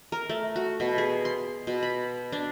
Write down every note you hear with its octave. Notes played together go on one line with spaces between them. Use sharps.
A#4
A3
F#4
B2
G#4
C6
B2
B5
D4